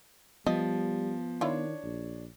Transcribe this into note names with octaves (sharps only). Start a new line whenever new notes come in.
F3 G3 B3 D#5
D#3 D4 E4 F4 C#5
A#1